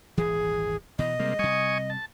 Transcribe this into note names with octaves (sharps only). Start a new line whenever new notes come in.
D#1 G#1 E3 G#4
B2 E3 D#5
C3 G3 G#3 A#3
C3 G3 G#5 C#6 D#6
A5